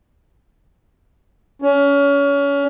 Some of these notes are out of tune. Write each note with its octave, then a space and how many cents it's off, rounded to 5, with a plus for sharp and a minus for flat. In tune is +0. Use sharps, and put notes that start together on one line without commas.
C#4 +30